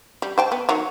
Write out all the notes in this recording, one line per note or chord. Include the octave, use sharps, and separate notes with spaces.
G3
C5 G5 A5
B3
D#3 F#3